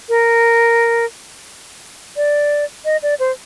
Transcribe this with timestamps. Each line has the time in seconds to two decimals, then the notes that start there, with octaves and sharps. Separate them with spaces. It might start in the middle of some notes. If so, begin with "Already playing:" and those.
0.09 A#4
2.17 D5
2.85 D#5
3.03 D5
3.20 C5